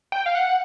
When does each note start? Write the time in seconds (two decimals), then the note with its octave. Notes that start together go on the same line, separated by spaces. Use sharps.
0.12 G5
0.26 F5
0.35 F#5